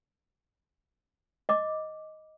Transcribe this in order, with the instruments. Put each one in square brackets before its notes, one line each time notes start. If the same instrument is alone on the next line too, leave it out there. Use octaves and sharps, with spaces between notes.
[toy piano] D#5 D6